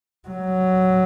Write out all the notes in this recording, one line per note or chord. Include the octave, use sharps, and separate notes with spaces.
F#3